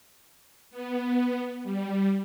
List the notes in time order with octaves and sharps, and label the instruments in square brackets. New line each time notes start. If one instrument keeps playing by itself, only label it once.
[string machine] B3
G3